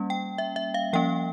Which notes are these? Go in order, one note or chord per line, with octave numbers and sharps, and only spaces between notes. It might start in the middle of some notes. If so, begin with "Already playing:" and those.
Already playing: G3 A#3 C#4
G5
E5
E5
F5
F3 A#3 C#4 G5